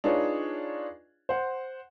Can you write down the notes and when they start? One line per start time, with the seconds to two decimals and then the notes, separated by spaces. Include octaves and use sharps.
0.04 D4 D#4 F4 G#4 B4 C#5
1.29 C5 F#5